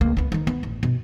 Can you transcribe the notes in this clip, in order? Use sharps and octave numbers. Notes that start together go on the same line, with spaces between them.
C#2 A#3
C#2 B3
D#3 D#4
B3
A1
B2